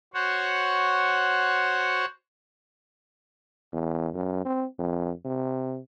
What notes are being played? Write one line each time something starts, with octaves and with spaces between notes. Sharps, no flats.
F#4 C5 C#5 F#5
E2
F#2
C4
F2
C3